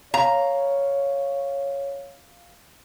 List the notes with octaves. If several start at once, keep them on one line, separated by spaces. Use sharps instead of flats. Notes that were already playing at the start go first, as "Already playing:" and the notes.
C#5 F5 A#5